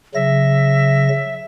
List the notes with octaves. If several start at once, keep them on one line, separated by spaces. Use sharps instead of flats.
C#3 F#3 E5 A#6